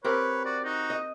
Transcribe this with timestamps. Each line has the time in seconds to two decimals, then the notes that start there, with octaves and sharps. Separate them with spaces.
0.04 C4 G4 A#4 B4 C#5
0.45 F#4 D5
0.64 D#4 F#4
0.90 D#5